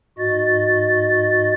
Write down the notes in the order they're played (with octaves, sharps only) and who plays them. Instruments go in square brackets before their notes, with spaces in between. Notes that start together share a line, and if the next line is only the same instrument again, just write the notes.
[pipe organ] G#2 F#4 D#5 A6